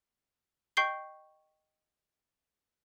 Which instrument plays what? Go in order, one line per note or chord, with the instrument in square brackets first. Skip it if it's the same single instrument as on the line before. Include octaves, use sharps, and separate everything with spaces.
[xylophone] D#5 G5 C#6 G6 C7 G7